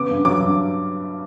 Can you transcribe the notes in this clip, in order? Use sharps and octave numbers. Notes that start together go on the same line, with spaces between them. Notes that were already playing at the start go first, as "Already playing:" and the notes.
Already playing: C#3 B3 D6
G2
F#3 D6
G2